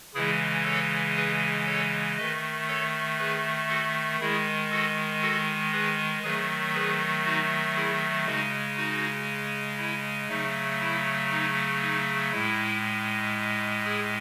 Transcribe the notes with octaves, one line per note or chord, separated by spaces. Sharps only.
C#3 E3 G#3 E4 G#4
A4 C#5
G#4 B4
A4 C#5
D#3 A3 B4 D#5
A4 C#5
G#4 B4
F#4 A4
D#3 G#3 E4 G#4
F#4 A4
F#4 A4
G#4 B4
D#3 F#3 A3 G#4 B4
G#4 B4
D#4 F#4
E4 G#4
C#3 G#3 D#4 F#4
D#4 F#4
E4
C#3 F#3 A3 D#4
E4
D#4
D#4
A2 G#3 E4
E4 G#4